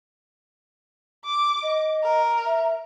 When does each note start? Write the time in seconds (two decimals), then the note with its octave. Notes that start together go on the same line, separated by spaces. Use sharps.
1.25 D6
1.62 D#5
2.04 A#4
2.45 E5